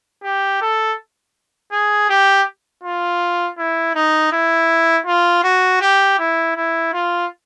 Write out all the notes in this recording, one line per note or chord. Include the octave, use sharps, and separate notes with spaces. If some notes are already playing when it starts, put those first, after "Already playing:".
G4
A4
G#4
G4
F4
E4
D#4
E4
F4
F#4
G4
E4
E4
F4